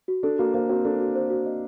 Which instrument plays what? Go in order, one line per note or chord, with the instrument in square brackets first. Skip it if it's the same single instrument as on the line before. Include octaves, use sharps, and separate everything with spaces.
[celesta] F#4
[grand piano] D4 [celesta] A4
[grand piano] A#3 [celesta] F#4
[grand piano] A#3 [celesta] C5
[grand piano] C4 [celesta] F#4
[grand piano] D4 [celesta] A4
[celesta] F#4
C5
F#4
D#5